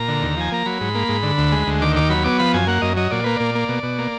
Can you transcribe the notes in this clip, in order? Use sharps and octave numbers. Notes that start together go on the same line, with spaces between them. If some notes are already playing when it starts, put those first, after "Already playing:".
Already playing: A#2 A#5
D3
D#2
F3 G#5
A#3 A#5
F#3 B5
G#2
A#3
G#2
D3
D2
G#3
D2
D#3 D6
D#2 D6
F#3 B5
B3 D6
F3 B5
F#2 G#5
A#3 F#5
F#2 D#5
F#3 D#5
A#2 D5
A#3 B4
A#2 D5
A#3
B2
B2
A#3